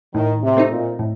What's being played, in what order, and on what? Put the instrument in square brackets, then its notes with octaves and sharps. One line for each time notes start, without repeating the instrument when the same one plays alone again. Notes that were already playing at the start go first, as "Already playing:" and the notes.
[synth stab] A2 [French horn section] D#3
[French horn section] C3
[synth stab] A3 C4 D#4
[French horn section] A#2
[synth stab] A2